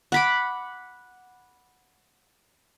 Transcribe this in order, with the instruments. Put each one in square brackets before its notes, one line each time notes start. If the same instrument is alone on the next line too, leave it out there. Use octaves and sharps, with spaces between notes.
[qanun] F#5 B5 D6